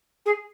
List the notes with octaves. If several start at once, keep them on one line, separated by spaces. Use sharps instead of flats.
G#4